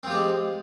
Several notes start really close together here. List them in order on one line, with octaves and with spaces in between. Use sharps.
C4 F3 G4 G#3